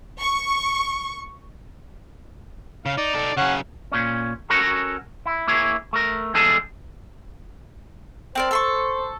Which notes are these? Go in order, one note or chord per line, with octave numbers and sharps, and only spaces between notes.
C#6
C#3 F5
D#4 D5
D#4 A4
C#3 F#3 C#4 F#5
A#2 C#4
C#4 F#4 A4 A#4 C#5
E4
A#3 E4 G#4 C#5
A3 A#4
E2 G3 G#3 G#4 A4 A5
C4 A#4 C5 D5
A4 C6 C#6